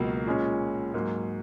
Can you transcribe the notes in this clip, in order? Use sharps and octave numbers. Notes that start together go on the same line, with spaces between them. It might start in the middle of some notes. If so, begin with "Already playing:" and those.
Already playing: C#2 B2 F#3 A#3
A#2 G#3 C#4
G#2 F#3 A#3